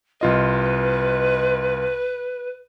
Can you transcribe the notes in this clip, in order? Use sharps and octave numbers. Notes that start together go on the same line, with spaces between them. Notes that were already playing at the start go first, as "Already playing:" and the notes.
C2 F4 B4 D#5